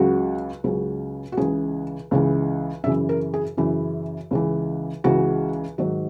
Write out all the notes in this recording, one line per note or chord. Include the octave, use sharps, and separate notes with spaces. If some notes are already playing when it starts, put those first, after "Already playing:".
Already playing: C#2 C#3 F#3 F#4
C#2 C#3 F#3
F#4
C#2 C#3 E3 G#4
C#2 C#3 E3
F#2 C#3 E3 E5
A#4
G#4
F#2 C#3 E3 E4
C#2 C#3 E3
C#2 C#3 E3 F#4
G#2 D#3 F#3